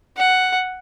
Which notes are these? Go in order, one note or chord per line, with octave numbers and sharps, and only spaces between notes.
F#5